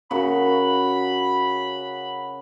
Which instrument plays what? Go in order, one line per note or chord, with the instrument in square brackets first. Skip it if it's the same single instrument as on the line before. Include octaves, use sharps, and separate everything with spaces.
[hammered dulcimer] C#3 F#4 A#4 [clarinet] B5